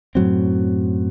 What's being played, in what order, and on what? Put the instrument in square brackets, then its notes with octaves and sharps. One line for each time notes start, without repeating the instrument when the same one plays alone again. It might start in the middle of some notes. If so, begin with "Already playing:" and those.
[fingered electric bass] F#2 A2 F#3 C4